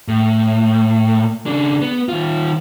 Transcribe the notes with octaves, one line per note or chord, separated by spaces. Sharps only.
A2
C#3 D4
B3
D#3 F4